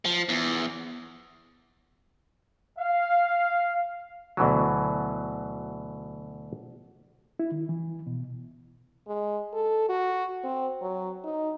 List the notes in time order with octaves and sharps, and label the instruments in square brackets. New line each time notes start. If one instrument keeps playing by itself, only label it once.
[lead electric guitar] F3
E2
[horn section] F5
[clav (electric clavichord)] D2 B2 E3 F#3
[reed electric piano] E4
D#3
E3
B2
[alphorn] G#3
A4
F#4
C4
F#3
D#4